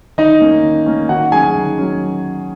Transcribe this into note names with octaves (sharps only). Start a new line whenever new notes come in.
D#3 D#4 D#5
A#3 C#4
D#3
A#3 C#4
D#3 F#4 F#5
F#3 C#4 G#4 G#5
D#3
F#3 C#4